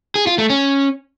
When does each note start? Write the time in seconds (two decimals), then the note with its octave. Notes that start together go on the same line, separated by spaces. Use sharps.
0.15 G#4
0.27 F4
0.38 A3
0.50 C#4